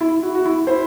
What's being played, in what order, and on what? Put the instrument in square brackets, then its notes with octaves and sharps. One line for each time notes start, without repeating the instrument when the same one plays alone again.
[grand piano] E4
F#4
F#4
E4
[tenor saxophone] E4 [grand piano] C5